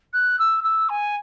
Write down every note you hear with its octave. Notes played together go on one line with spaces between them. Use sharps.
F#6
E6
E6
G#5